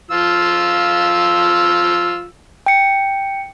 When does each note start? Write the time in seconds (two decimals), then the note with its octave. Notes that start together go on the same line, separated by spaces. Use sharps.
0.11 F3 F4 E6
2.66 G5 C#7